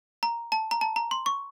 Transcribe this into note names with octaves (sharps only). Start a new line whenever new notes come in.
A#5
A5
A#5
A5
A#5
C6
C#6